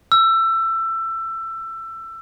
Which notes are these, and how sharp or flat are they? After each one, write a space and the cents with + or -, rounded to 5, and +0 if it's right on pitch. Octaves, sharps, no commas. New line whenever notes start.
E6 +20